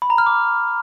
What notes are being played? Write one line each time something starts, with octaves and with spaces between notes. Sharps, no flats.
B5
A#5
F6
D6